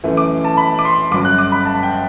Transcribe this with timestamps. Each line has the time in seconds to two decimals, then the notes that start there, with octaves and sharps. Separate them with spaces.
0.04 F#2 E3 A3
0.17 D6
0.44 A5
0.57 B5
0.79 D6
0.85 C6
1.11 G1 F#2 F#3 D6
1.25 F#6
1.39 D6
1.52 B5
1.65 A5
1.83 G5